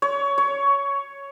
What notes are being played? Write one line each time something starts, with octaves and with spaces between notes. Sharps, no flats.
C#5
C#5